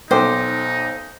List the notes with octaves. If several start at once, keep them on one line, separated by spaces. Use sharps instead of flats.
B1 D#4 A4 C5 G5 D6